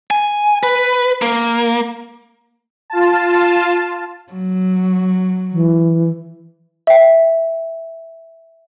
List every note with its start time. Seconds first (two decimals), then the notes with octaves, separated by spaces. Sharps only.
0.11 G#5
0.63 B4
1.22 A#3
2.90 F4 A5
4.32 F#3
5.53 E3
6.87 E5 G5